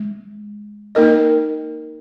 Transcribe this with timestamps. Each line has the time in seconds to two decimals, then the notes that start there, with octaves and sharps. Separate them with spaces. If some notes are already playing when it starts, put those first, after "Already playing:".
Already playing: G#3
0.95 A#3 D#4 A#4 D#5